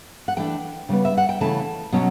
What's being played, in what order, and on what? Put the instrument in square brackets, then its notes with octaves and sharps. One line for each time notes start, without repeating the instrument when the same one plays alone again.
[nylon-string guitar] F#5
E3 A3 D4 G5
C#3 G3 B3
E5
F#5
G5
C#3 E3 A3 A5
B2 F#3 C#4